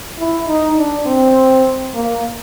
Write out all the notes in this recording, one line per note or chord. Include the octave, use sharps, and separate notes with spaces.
E4
D#4
D4
C4
A#3